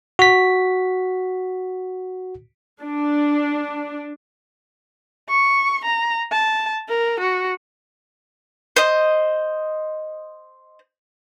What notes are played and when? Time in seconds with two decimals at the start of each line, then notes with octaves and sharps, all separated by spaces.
0.19 F#4 B6
2.83 D4
5.29 C#6
5.85 A#5
6.31 A5
6.89 A#4
7.20 F#4
8.76 C5 D#5